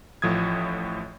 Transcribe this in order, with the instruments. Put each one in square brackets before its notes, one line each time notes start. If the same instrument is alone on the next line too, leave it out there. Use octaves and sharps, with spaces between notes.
[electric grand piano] A1 A2 F3 D#6 G#6